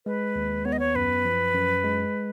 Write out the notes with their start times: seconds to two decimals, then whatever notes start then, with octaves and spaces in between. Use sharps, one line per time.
0.06 G#3 B4
0.36 D#2
0.65 B3 C#5
0.72 D#5
0.79 C#5
0.96 F#2 B4
1.25 F3
1.55 F#2
1.84 G#3